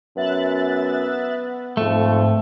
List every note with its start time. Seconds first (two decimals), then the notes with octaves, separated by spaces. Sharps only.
0.17 F#2 B3 E5 F#6 A6
1.77 F2 G#2 A3